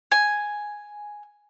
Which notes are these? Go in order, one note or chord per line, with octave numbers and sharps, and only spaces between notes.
G#5